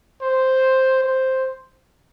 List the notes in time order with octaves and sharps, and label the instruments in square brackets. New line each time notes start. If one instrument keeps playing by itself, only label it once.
[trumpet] C5
C5